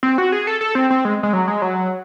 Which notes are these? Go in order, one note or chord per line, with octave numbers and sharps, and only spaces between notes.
C4
F#4
G#4
A4
A4
C4
C4
G#3
G#3
F#3
G#3
F#3